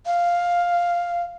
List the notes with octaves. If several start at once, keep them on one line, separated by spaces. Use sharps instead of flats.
F5